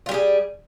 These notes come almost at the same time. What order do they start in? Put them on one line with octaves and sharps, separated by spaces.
F4 G3 G4 G#4